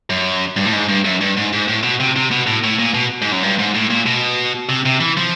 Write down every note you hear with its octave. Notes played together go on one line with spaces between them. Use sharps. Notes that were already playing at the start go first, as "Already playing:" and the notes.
F#2
G2
A2
G#2
G2
F#2
G2
G#2
G#2
A2
B2
C3
C3
B2
A2
A2
A#2
B2
G#2
F#2
G2
G#2
A2
A#2
B2
C3
C3
E3
F3